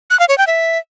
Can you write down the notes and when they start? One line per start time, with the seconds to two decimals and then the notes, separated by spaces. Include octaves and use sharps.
0.10 F#6
0.20 F5
0.29 C#5
0.38 G5
0.47 E5